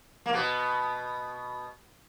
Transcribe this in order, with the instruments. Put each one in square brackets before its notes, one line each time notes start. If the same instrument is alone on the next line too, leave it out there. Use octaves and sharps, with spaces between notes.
[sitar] A#3
B2 B3